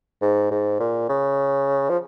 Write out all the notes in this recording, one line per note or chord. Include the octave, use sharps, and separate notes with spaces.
G#2
G#2
A#2
C#3
F3